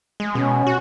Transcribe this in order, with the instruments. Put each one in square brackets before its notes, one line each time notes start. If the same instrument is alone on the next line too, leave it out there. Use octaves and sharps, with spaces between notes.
[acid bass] G#3
[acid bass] B2 [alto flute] C#4
[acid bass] F#4